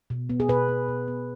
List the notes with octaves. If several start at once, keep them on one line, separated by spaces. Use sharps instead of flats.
B2
B3
G#4
B2 B4
B3
B2
B3